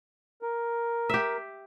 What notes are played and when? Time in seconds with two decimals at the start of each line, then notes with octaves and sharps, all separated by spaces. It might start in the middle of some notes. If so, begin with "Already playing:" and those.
0.42 A#4
1.09 G4 E5